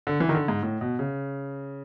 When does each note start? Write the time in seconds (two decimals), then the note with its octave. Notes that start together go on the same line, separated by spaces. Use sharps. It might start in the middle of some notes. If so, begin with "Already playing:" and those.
0.07 D3
0.20 E3
0.29 D#3
0.35 D3
0.48 G#2
0.63 A2
0.81 B2
0.99 C#3